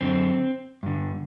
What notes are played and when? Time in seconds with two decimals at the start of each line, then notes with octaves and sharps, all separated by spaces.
0.01 F#2 D3 C4
0.83 G2 D3